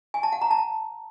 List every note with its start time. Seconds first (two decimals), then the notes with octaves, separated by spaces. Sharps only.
0.14 G#5
0.23 A5
0.32 F#5
0.41 A#5
0.51 A5